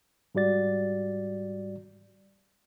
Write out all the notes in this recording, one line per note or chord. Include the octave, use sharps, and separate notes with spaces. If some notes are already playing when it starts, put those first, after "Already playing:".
G#2 G3 F#4 D5 A6